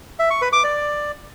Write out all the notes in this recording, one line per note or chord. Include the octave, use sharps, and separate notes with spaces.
E5
C#6
B4
D6
D5